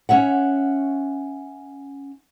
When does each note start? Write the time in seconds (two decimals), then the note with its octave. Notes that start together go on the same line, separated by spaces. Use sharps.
0.09 C#4 C#5 E5 F#5